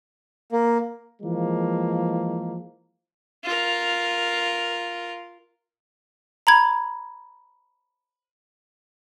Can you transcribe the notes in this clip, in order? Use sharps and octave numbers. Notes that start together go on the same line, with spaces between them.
A#3
E3 F3 G#3 A#3
F4 A#4
A#5 B5 G#6